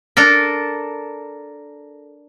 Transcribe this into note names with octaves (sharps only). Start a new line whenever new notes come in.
D4 A4 A#4